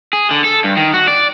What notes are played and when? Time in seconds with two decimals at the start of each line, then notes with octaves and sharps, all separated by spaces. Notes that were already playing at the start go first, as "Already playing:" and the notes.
0.13 G#4
0.31 D3
0.44 A4
0.64 G2
0.77 D#3
0.94 F#4
1.08 D5